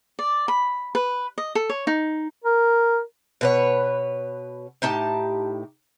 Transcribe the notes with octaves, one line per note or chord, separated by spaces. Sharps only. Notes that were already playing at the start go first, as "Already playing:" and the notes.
D5
B5
B4
D#5
A4
C#5
D#4
A#4
B2 B4 C#5
A2 D#4 G4 A5